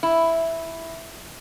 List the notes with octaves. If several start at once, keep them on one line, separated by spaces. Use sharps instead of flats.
E4